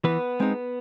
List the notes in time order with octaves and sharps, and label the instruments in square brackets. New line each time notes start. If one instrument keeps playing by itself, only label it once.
[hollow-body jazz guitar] E3 B3 B4
G#3 C4 D#4